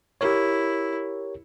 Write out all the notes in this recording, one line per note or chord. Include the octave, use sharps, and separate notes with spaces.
E4 G4 A#4 C#5